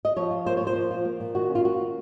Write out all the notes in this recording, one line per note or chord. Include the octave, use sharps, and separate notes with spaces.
D#5
F3 C#5
F4
A#3 C5
A#2 C#5
C5
F3
F4
A#3
A#2
D#3 F#4
C#4
F4
A#3 F#4